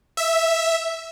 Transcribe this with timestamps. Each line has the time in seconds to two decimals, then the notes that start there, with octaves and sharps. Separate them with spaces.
0.17 E5